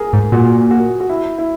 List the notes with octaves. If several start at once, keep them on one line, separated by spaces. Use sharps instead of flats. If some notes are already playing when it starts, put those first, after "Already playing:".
Already playing: G#4 A#4
G#2
A#2 F#4
F#4
F#4
E4
E4